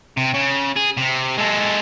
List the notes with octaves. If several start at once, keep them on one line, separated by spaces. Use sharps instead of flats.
C3
C#3
G#4
C3
G#3 A4